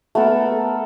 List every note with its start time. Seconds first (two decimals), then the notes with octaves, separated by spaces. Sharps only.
0.15 A3 B3 A4 A#4